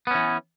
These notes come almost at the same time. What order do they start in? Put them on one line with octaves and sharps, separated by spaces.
B3 C#4 E3